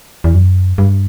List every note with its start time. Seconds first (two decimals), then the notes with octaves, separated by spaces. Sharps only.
0.24 E2
0.34 F#2
0.78 G2